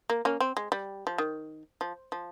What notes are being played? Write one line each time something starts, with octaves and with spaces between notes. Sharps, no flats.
A#3
A#3 C#4
C4
G#3
G3
F3
D#3
F3
F3